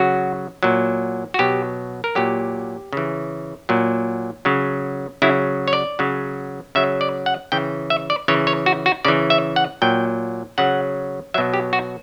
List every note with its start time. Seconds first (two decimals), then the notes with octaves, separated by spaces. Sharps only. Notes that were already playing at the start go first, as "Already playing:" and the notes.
Already playing: C#3 F#3 F#4
0.63 A#2 F#3
1.34 F#4
1.39 B2 F#3 G4
2.04 A#4
2.15 A#2 F#3 G4
2.93 C#3 E3
3.69 A#2 F#3
4.45 C#3 F#3
5.22 C#3 F#3 E4
5.68 C#5
5.73 D5
5.99 C#3 F#3
6.75 C#3 F#3 E5
7.01 D5
7.26 F#5
7.52 C#3 E3 G5
7.90 E5
8.10 D5
8.28 C#3 E3 C#5
8.47 C#5
8.66 F#4
8.86 F#4
9.05 C#3 E3 D5
9.30 E5
9.56 F#5
9.82 A#2 F#3 G5
10.58 C#3 F#3 F#5
11.34 B2 F#3 E5
11.54 G4
11.73 F#4